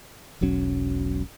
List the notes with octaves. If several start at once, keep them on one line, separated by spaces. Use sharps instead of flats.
E1 B1 F#3 C#4